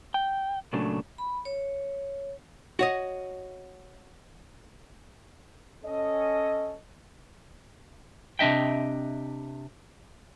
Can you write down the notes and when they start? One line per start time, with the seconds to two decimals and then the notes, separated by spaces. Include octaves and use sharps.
0.14 G5
0.73 A#2 C#3 F#3 A3 D4
1.18 B5
1.45 C#5
2.79 F#4 C#5 D#5
5.84 C#4 A4 D#5
8.39 C3 D4 D#5 E5 G5